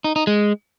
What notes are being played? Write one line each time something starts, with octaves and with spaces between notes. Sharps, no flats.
D#4
D#4
G#3